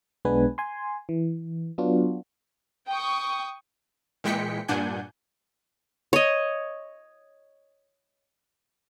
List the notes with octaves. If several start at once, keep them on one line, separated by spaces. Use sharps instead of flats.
B1 G#3 B3 D4 B4 G#5
G#5 C6
E3
F#3 B3 D4 F4 F#4
G5 C#6 D#6
A#2 E3 G#3 G5 B6 C#7
G2 A#2 D4 F#5 G#5 G6
C#5 D#5